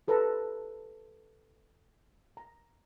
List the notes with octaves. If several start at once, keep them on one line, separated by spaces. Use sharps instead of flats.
G4 A4 B4 C5 A#5
A#5